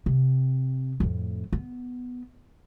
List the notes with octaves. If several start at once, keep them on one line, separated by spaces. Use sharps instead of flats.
C3
F2 A2
B3